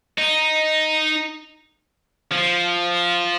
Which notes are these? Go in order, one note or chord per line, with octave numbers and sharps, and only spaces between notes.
D#4
F3